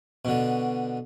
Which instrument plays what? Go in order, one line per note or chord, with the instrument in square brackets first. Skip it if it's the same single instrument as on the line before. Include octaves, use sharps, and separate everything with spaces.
[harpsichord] B2 D3